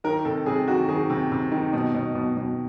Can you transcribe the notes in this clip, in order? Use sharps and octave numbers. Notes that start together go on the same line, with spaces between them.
D#3 A#4
C3 A4
C3 G#4
D#3 F#4
D#3 G#4
C3
C3
D#3
B2
B2
B2
B2